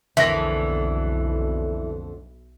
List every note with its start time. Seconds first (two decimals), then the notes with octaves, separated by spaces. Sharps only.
0.17 B1 F2 D3 E3 A#3 E5 A#6